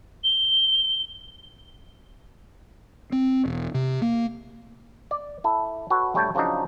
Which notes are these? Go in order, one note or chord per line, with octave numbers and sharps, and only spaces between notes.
G7
C4
E1
C3
A#3
D5
E4 A4
F#4 A4 B4 C#5
A#1 G3 A3 C#5 G5 A5
C#3 F3 F#3 D4 D#4